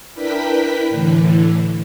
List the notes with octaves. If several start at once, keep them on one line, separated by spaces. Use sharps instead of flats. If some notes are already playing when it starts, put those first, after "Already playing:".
D4 E4 A#4 B4 G5 B6
A2 D3 E3